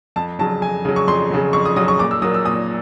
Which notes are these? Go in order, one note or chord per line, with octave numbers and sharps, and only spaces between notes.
F2 A5
C#3 F#3 A5
F2 G#5
C#3 F#3
C#6
F2 C6
C#3 F#3
F2 C#6
D#6
C#3 F#3 D#6
C#6
A#2 D6
E6
F#3 A#3 D#6
E6
A#2 D#6